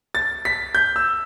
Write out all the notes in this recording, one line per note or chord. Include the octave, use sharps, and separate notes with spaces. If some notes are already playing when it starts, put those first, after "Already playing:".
A6
B6
G6
E6